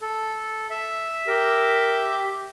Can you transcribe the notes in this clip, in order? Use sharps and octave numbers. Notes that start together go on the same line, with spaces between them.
A4
E5
G4 A#4